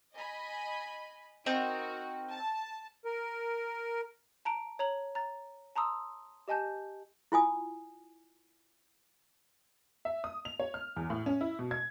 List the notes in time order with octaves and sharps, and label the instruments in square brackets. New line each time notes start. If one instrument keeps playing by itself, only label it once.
[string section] D#5 G#5 B5
[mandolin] C4 D#4 A#4 [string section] F#4
[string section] A5
[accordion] A#4
[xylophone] A5 A#5 D7
C#5 A#5 F#7
A#5 A6
A5 A#5 C6 D#6 E6
G4 D#5 G#5 A5 G6
[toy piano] E4 F4 G#5 D#6
[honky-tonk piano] E5
D#6
F7
C#5
F6
E2
A2
C#4
E4
B2
G#6